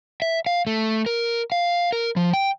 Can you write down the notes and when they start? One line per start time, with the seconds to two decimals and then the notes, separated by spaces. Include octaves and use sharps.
0.22 E5
0.46 F5
0.67 A3
1.06 A#4
1.52 F5
1.93 A#4
2.16 F3
2.34 G5